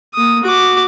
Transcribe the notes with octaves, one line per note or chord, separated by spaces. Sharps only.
A#3 D#6
F#4 D6